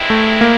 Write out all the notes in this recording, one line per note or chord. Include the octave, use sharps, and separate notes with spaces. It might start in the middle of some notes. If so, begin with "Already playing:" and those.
Already playing: G2 D#3 G#3 C4 E4
A3
A#3